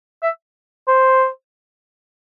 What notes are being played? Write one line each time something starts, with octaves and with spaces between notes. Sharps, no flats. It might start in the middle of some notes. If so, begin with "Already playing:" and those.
E5
C5